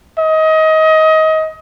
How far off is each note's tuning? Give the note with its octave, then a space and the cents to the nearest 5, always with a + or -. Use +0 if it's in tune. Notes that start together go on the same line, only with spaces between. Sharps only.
D#5 +25